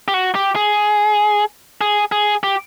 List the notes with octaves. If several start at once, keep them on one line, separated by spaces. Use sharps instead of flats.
G4
F#4
G4
G#4
G#4
G#4
G4